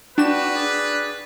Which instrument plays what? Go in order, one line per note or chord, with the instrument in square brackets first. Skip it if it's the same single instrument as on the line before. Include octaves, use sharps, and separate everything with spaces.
[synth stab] D4 E7 [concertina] F#4 G5 [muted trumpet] B4
[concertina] G#4 D5